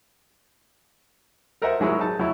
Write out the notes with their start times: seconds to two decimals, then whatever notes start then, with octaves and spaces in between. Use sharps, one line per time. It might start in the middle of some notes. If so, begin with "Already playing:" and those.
1.62 A4 A#4 C5 D#5 E5 F#5
1.80 D#3 F#3 G#3 E4 C#5
2.00 D#4 A5
2.19 F#3 E4